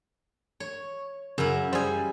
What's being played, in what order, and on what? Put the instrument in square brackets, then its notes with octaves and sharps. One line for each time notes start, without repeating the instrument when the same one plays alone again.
[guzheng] C#5
[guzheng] F#2 E4 [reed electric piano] C#3
[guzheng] G3 G#5 [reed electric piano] G#4 C5